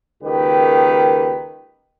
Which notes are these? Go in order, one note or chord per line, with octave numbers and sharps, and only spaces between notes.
C#2 D#3 A#3 G4 B4